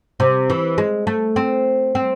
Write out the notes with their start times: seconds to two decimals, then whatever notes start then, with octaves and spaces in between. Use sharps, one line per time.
0.20 C3
0.50 E3
0.78 G#3
1.07 A3
1.36 C4
1.95 C4